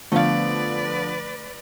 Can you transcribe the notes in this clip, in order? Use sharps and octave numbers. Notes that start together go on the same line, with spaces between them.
D3 F3 A3 B3 B4 D5 F5